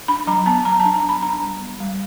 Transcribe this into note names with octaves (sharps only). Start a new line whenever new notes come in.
D4 B5
F#3 A#5
B3 A5
F#3 A#5
A5
D4
A#5
F#3
B5
D4 A#5
G3
B3
G3